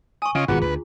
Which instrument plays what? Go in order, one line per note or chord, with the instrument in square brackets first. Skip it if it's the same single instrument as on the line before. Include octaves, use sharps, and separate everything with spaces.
[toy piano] G#5 C#6 [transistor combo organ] D#6
[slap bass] C#3 [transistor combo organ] C#4 F4 D#5
[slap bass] G#1 F#2 B2 [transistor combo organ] B3 F#4 [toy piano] F4 G#4 A#5
[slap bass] D2 [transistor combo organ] B4